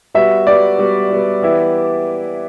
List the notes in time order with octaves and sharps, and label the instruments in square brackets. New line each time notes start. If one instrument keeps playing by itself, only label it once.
[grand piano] G3 B3 F#4 [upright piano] E5
[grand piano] G3 B3 F#4 [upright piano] D5
[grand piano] G3 B3 F#4
G3 B3 F#4
E3 B3 E4 G4